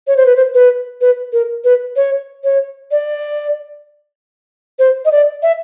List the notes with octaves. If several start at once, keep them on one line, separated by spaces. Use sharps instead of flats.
C#5
C5
B4
C5
B4
B4
A#4
B4
C#5
C#5
D5
C5
D#5
D5
E5